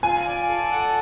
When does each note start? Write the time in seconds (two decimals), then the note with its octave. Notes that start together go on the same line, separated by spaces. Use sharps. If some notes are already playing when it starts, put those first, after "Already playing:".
0.03 F4 G#5
0.26 D5
0.49 A4
0.71 F#5